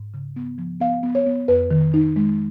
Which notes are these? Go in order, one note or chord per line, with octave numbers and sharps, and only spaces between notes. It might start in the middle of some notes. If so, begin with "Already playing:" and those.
Already playing: G#2
C#3
B3
F3
B3 F5
B3
C#5
B3
F2 B4
D#3
D#4
G#3